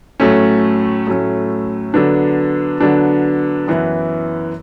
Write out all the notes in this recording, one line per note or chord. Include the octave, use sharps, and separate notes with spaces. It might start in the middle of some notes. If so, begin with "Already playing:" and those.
A2 F#3 A3 C#4
A2 F#3 A3 C#4
D3 F#3 B3 D4
D3 F#3 B3 D4
F#2 E3 B3 E4